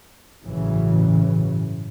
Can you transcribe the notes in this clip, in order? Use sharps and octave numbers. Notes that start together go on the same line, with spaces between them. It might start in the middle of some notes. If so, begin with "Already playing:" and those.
A1 G2 C#3 E3 F#3